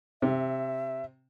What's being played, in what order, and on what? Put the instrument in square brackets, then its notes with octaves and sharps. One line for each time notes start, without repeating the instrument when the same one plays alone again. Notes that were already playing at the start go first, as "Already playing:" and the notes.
[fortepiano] C3 [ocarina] E5